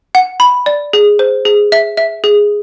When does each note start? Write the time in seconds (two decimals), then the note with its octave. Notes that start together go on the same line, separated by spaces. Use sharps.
0.15 F#5
0.40 B5
0.66 D5
0.93 G#4
1.19 C5
1.45 G#4
1.72 E5
1.97 E5
2.24 G#4